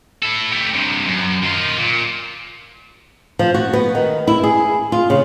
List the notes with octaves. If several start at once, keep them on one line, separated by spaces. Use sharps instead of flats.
E4 A4
A3 G4
G2 C3
F#2
D#3 F4
A#2
F3
F#4
B3
D#3
E4
G#4
F4
C#3